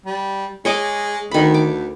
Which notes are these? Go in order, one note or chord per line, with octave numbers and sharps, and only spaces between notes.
G3
G#3 C#5 D#5 D6
D2 D#3 B5
D6